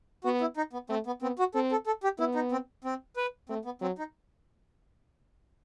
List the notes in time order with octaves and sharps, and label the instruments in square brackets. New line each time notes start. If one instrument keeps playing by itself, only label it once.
[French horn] B3 [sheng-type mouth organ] F#4
[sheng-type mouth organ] E4
D#4
B3
[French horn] A3 [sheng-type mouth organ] C4
[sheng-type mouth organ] B3
[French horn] B3 [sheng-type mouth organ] C4
[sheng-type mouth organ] F#4
[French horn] C4 [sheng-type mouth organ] A4
[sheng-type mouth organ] A4
A4
G4
[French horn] B3 [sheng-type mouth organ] E4
[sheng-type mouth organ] D#4
C4
C4
B4
[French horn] A3 [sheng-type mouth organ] C4
[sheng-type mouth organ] B3
[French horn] F#3 [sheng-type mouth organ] C4
[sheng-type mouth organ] D#4